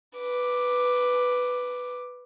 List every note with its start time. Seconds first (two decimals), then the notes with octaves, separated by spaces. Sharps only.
0.17 B4 D6